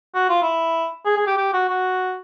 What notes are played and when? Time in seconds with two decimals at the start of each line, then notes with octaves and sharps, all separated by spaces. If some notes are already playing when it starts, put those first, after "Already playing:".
0.15 F#4
0.29 F4
0.42 E4
1.06 G#4
1.17 G#4
1.27 G4
1.37 G4
1.53 F#4
1.69 F#4